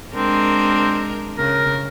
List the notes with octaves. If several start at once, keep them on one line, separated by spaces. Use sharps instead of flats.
G#3 C4 D4 A#4
C#3 A#4